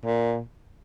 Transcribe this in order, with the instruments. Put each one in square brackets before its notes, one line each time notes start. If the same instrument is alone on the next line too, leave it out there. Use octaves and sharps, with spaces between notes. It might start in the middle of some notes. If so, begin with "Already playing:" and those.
[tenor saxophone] A#2